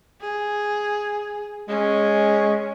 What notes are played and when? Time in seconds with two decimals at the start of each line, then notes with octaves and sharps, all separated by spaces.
0.21 G#4
1.68 G#3 C#4